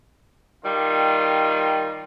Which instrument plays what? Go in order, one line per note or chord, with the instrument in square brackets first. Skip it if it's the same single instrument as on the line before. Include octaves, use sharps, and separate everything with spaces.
[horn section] D#3 G3 F4